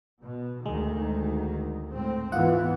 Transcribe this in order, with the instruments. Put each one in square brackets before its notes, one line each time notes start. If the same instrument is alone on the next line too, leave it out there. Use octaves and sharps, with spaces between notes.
[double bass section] B2
[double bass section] D2 D#3 [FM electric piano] G#3
[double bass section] A2 C4
[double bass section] G#2 E3 B3 [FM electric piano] F4 F#5